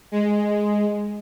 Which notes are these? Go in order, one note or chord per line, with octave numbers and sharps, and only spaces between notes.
G#3